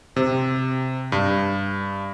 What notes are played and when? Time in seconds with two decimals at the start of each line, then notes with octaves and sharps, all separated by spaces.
0.16 C3
1.12 G2